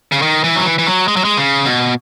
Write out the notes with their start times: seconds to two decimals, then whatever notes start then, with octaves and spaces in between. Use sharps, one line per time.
0.12 C#3
0.22 D#3
0.44 E3
0.56 F#3
0.65 E3
0.78 E3
0.86 F#3
1.08 G#3
1.16 F#3
1.24 G#3
1.37 C#3
1.65 B2